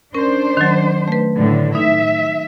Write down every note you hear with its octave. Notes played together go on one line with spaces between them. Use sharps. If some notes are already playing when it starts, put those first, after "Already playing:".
C#4 D4 A#4 C5
D#3 F#3
A3 B4
A2 D3
D#4 E5